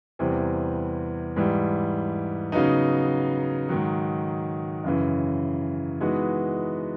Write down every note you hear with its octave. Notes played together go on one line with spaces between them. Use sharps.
E2 C3 E3 G3 C4
G#2 E3 G3
C#3 F#3 B3 D#4
G#2 D#3 F#3
F#2 C#3 E3
E3 G#3 B3 D#4 F#4